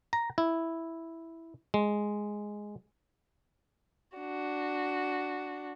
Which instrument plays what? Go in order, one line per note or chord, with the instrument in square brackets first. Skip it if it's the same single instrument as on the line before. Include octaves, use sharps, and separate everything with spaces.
[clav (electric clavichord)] A#5
E4
G#3
[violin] D4 F#4